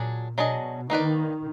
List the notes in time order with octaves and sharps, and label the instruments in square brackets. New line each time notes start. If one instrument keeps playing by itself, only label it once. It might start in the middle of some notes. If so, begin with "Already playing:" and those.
Already playing: [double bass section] A#2 [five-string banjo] F#3 D4 G#4
[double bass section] B2 [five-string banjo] F#3 D4 G#4 D#5
[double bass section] D#3 [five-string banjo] A#3 D#4 F#4 B4 D5